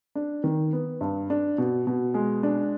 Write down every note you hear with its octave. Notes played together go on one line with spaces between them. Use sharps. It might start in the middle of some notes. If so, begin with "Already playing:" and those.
D4
D#3
B3
G2
D4
B2
B2
G#3
D4